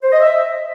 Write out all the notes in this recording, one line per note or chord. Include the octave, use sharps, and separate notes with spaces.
C5
D#5
E5